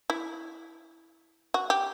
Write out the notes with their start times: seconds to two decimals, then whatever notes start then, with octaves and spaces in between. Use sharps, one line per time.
0.10 E4
1.54 F#4
1.70 G4